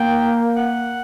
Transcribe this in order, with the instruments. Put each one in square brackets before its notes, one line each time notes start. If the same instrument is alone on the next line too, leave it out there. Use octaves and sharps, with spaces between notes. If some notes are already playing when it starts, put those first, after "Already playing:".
Already playing: [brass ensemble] A#3 [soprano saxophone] G5
[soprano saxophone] F#5